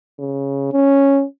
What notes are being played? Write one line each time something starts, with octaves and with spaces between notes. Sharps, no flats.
C#3
C#4